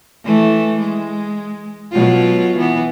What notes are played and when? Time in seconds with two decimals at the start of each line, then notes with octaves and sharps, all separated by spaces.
0.24 E3 A3
0.80 G#3
1.91 B2 F#3 F4
2.58 E3 B3